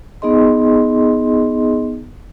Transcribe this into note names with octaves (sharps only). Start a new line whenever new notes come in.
B3 D#4 G#4 D#5 C6